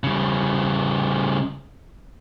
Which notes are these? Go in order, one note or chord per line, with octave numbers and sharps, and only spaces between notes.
C#3 G3